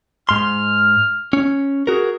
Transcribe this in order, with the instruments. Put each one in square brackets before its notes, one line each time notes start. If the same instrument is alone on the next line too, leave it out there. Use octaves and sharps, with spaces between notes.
[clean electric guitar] G#2 C6 [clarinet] F6
[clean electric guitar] C#4
[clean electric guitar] F#4 A#4 [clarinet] G#4